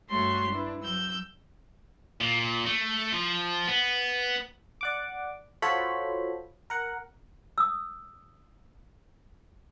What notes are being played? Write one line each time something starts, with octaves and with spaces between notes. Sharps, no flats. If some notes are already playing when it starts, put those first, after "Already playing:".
G2 A3 F#4 C#5 C6
D4 E4 B4
F#3 E6 G6
A#2
A3
F3
B3
D5 F#5 D6
F4 F#4 A4 C5 C#5 B5
A#4 F#5
D#6 E6